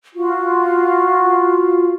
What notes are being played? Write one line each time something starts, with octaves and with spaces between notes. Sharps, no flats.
F4 F#4